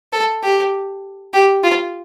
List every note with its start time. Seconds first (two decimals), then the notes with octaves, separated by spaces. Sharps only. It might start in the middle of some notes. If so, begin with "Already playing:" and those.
0.13 A4
0.43 G4
1.34 G4
1.63 F4